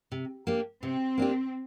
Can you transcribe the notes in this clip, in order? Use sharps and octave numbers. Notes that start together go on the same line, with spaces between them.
C3
A#3 D4 G4
C3 C4
A#3 D4 G4